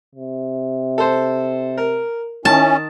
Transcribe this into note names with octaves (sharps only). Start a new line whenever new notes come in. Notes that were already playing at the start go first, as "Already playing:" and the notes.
C3
A4 C5
A#4
D#3 C#4 E4 A5